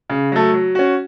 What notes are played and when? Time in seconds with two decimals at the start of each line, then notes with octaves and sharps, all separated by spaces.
0.10 C#3
0.32 F#3 A3
0.54 F#3
0.75 C#4 F#4